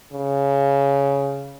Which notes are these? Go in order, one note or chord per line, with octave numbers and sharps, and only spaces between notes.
C#3